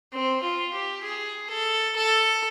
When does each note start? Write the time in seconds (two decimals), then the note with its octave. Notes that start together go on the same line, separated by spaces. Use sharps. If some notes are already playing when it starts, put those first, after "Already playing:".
0.13 C4
0.43 F4
0.74 G4
1.03 G#4
1.50 A4
1.96 A4